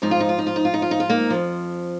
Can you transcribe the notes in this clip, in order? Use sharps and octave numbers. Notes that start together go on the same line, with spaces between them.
G#2 F3 D#4
F4
D#4
F4
D#4
F4
D#4
F4
D#4
F4
D#4
F4
A#3 D#4
F2 F3